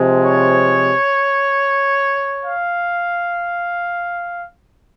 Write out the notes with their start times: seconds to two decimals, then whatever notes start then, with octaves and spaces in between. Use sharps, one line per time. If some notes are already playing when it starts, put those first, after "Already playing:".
Already playing: C3 F3 G#3
0.22 C#5
2.44 F5